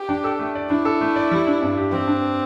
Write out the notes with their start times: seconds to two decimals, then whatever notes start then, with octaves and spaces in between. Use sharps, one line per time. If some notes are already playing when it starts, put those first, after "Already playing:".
Already playing: G4
0.09 D4
0.24 A4
0.39 A3
0.55 D5
0.70 D4 E4
0.85 A4
1.01 A3
1.16 D5
1.31 G3
1.47 D4
1.62 G2
1.77 G4
1.92 G3 C4
2.08 D4